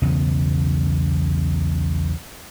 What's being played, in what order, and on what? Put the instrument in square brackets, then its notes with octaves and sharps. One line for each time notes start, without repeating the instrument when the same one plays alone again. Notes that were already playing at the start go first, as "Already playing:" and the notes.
[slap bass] B1 E2 C#3 B3